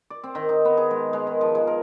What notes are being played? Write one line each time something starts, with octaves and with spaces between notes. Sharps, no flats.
D5
C4
D#3
D#4
B3
G#4
G#3
G#3
D#3
F3
G#3
A#4